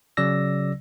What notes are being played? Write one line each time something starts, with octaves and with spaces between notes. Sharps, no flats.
C#3 F#3 D5 E6 A#6